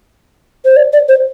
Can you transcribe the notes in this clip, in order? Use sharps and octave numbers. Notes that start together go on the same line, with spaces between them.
C5
D5
D5
C5